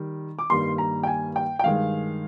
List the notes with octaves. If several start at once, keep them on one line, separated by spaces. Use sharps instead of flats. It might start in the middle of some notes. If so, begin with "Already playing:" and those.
Already playing: D#3 G3
D6
G2 D#3 G3 A#3 C6
A#5
G5
G#5
G5
G5
G2 D#3 G#3 F5